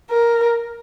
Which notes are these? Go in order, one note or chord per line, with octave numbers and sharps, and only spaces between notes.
A#4